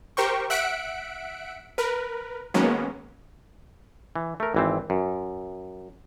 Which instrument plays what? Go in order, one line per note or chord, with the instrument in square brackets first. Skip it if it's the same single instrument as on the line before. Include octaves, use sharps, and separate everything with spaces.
[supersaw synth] G4 A#4 C5 G5 C#6
E5 F#5 F#6 B6 C#7 D7
A#4 B4
D#3 F#3 G#3 A#3 B3 C#4
[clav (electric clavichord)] E3
A3 A#4
G#1 E3 C4
F#2